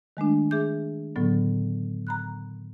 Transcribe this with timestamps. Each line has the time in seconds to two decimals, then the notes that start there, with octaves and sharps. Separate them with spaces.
0.17 D#3 G#3 A3 D4
0.51 G#4 E5 D6 G6
1.16 A2 D3 F#3 B3
2.07 A#5 B5 F#6